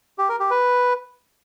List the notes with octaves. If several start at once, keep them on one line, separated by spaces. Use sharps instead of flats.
G4
A#4
G4
B4